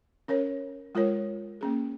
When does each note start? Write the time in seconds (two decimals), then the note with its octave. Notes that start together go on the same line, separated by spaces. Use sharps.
0.28 C#4 A#4 C#5
0.95 G#3 F4 A#4 C#5
1.61 A#3 C#4 G#4